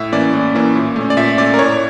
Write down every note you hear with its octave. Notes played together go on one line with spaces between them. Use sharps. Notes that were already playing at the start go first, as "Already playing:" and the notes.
Already playing: A2 E5
E3 A#3 C#4 D5
A2
E3 A#3 C#4
A#2
A3 C#4
D5
A#2 E5
A3 C#4 D5
A#4
A2 C#5